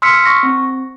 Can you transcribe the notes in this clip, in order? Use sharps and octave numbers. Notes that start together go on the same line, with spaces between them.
C6 E6 F6 B6 C#7
C#6 A#6
C4